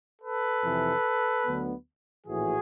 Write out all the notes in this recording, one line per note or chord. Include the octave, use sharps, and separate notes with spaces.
A4 B4
F2 C3 E3
D2 D3 F#3 B3
A#1 A2 E3 F#4 G#4